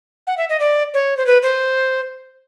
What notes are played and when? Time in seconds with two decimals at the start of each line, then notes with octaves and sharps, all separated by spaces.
0.27 F#5
0.37 E5
0.50 D#5
0.60 D5
0.94 C#5
1.17 C5
1.26 B4
1.43 C5